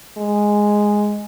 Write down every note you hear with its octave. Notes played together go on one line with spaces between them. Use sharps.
G#3